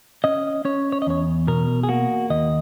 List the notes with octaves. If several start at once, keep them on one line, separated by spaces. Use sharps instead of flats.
C#4 D#5
C#4 C#5
C#5
D#5
E2 C#5
B2 A#4
G#4
A#3 F#4
D#2 D#5